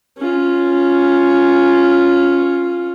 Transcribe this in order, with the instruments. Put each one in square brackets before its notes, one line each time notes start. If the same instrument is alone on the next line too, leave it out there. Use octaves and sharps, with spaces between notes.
[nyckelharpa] C#4 F4